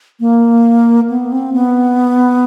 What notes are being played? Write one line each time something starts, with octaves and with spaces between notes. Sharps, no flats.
A#3
B3
C4
B3